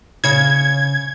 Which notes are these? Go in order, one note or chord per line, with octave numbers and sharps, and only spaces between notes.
C#3 C#5 G#6